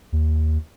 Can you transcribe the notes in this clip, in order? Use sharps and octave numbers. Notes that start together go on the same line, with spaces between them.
D#2